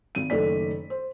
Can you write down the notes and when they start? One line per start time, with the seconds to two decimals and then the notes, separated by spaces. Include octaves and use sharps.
0.15 G#1 D#7
0.30 F#1 D#3 A3 A4 D5 B6
0.90 C5